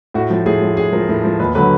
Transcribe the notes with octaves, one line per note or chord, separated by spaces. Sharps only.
A2 F#4
F3
A2 G#4
F3
A2 G#4
F3 A#4
A2
F3
D#2 B4
D3 F#3 B4